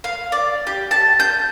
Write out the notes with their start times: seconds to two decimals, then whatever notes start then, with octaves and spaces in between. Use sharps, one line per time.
0.04 F5
0.32 D5
0.67 G4
0.91 A5
1.20 G6